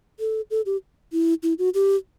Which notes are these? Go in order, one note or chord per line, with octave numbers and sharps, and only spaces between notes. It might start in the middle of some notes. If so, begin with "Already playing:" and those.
A4
A4
G4
E4
E4
F#4
G4